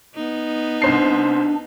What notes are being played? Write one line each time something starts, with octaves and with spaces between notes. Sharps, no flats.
B3 D#4
C2 D4 C5 C7